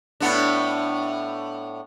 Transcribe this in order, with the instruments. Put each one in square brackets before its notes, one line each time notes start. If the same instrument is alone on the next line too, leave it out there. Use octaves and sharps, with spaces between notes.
[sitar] A2 B3 D4